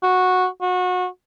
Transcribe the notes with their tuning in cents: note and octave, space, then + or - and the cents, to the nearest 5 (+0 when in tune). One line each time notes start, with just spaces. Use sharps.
F#4 -10
F#4 -30